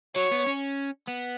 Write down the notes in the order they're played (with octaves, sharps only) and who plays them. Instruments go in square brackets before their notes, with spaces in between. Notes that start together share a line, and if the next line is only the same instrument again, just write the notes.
[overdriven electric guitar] F#3 [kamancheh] C#5
[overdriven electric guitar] B3
C#4
B3